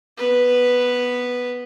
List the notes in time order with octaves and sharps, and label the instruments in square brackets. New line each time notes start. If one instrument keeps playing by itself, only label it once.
[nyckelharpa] B3 B4